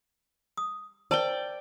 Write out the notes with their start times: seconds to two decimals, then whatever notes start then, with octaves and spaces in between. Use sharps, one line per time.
0.57 D#6
1.11 A#4 C5 D5 G5 A5